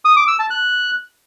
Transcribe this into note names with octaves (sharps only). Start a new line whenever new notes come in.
D#6
D6
E6
A5
F#6